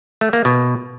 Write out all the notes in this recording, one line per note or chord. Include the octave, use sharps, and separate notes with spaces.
A3
A#3
B2